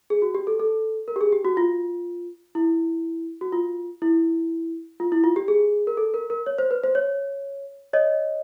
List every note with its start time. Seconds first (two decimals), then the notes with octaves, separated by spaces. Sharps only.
0.10 G#4
0.22 F#4
0.35 G4
0.47 A4
0.60 A4
1.08 A#4
1.16 G4
1.21 G#4
1.32 G4
1.45 F#4
1.57 F4
2.55 E4
3.41 F#4
3.52 F4
4.02 E4
5.00 F4
5.12 E4
5.24 F4
5.36 G4
5.48 G#4
5.87 A#4
5.97 A4
6.14 A#4
6.30 A#4
6.46 C#5
6.58 C5
6.71 B4
6.84 C5
6.95 C#5
7.93 C#5 D#5